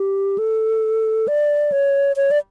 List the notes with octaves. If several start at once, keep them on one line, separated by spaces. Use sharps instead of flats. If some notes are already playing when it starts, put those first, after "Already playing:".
Already playing: G4
A4
D5
C#5
C#5
D5